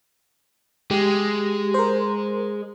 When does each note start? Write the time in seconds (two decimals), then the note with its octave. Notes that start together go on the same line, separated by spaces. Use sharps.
0.91 G#3 G4
1.74 A#4 C5